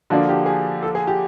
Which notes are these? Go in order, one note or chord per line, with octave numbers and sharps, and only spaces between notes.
D3 F3 A#3 D4 F#4
G4
G#4
A4
G#4
G4